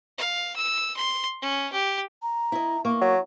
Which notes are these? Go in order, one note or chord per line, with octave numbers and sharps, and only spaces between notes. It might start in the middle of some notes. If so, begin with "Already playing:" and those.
F5
E6
C6
C#4
G4
A#5
E4 D#5
A#3 C#6
F#3